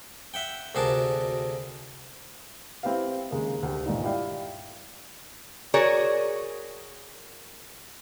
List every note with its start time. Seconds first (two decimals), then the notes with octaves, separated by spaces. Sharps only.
0.34 E5 F#5 G5
0.75 D2 C3 F#4 G#4 A#4 A5
2.83 C4 E4 G4 B4 F5
3.31 D#2 C#3 G#3 A#3
3.63 D2 G4
3.85 G1 A#2 D#4
4.04 E4 G4 D5 F5 G5
5.74 F#4 G#4 A#4 C#5 D5